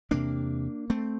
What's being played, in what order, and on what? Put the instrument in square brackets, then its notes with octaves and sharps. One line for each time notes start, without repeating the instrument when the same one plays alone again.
[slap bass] E2 C3 A#3 D4
A3 C4